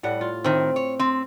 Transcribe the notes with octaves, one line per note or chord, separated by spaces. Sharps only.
A2 G3 F#5
F4
A2 D#3 C4
C#5
C4